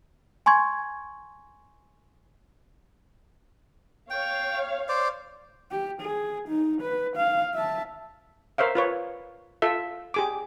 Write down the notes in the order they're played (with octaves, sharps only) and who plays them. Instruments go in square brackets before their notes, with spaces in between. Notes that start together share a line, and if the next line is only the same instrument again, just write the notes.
[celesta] G#5 C6 C#6 G#6
[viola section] C#5 F5 [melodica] G5
[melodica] C5 D5
[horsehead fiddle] G4
G#4
D#4
B4
F5
E5 A5
[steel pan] A#4 C5 C#5 E5 F5
F4 B4 C#5
F4 A4 E5
G4 G#4 D6